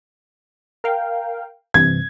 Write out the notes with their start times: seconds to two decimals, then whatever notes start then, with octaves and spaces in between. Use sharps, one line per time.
0.84 A#4 F5 G5
1.74 G2 C3 E3 G#6